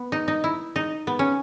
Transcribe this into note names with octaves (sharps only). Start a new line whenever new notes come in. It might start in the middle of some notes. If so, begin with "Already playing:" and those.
Already playing: B3
D#4
D#4
E4
D#4
B3
C#4